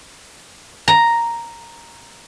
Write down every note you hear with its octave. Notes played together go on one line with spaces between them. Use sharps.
A#5